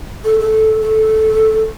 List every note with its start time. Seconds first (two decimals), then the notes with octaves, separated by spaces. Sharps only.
0.25 A4
0.39 A4
0.81 A4